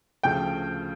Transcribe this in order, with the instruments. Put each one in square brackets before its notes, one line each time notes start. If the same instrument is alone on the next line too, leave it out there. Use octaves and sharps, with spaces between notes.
[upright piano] D2 C#3 F3 A3 [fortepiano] G5